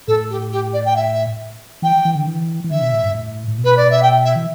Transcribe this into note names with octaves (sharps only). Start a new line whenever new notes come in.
A2 A4
G4
G4
D5
G5
E5
E3 G5
E3
D3
E3
E3
D3 E5
B2
A2
G2
A2
A2
B2
B4
D5
E5
G5
E5
E3